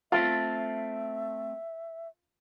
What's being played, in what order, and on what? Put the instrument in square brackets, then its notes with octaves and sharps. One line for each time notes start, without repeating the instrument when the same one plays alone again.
[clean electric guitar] A3 C4 A4 [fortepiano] F4 [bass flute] E5